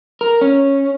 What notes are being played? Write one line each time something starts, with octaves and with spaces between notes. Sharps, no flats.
A#4
C#4